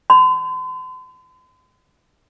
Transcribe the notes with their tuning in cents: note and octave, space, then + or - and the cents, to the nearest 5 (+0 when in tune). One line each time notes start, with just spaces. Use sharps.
C6 -45